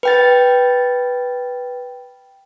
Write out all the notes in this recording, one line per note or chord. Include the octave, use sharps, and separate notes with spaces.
B4 G5 A6